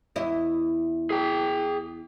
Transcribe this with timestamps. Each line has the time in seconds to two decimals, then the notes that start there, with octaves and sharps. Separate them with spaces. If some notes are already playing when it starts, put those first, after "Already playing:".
0.16 E2 E4 D#5
1.10 G#4 G5